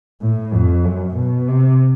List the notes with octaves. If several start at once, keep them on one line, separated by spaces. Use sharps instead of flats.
A2
F2
F#2
B2
C3